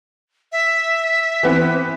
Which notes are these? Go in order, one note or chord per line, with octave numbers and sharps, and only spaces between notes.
E5
E3 B3 C4